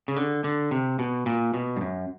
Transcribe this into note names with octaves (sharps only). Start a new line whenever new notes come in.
C#3
D3
D3
C3
B2
A#2
B2
G2
F#2